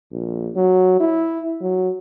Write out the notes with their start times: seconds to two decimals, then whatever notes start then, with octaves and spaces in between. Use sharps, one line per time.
0.12 A#1
0.56 F#3
1.00 E4
1.61 F#3